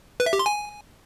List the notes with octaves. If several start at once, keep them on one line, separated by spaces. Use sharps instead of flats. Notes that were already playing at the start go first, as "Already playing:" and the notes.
B4
E5
G4
C6
G#5